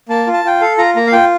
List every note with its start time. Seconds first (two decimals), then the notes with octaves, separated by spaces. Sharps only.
0.09 A#3 A5
0.27 F4
0.33 A5
0.44 F4 G5
0.61 A4 F5
0.78 F4 A#5
0.96 A#3 A#5
1.07 F5
1.12 F4 G5